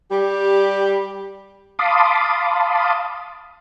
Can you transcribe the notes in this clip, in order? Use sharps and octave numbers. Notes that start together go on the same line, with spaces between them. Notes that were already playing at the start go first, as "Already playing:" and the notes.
G3 G4
F5 A5 B5 C6 D6 D#6